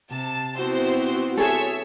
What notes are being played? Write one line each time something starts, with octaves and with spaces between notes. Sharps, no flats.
C3 A5
B3 C4 E4 F#4 C5
G#4 A4 C#5 E5